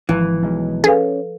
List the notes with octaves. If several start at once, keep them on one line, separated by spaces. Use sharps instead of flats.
G#1 E3 F3
B1 G#3
C#4 G#4 A4 B4 F5